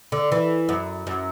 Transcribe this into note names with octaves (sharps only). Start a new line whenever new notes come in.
D3
E3
F#2
F#2